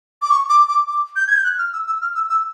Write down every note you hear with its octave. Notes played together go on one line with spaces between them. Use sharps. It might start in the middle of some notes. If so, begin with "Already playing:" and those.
D6
C#6
D6
D6
D6
G6
G#6
G6
F#6
F6
E6
E6
F6
E6
E6